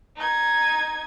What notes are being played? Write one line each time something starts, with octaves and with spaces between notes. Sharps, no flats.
D#4 G#6